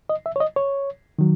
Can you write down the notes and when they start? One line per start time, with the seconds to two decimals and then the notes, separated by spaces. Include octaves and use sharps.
0.10 D#5
0.26 E5
0.36 C#5
0.40 D#5
0.56 C#5
1.19 D#3 F#3